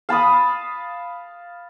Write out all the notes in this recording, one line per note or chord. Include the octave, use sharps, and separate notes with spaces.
F5 A5 B5 D#6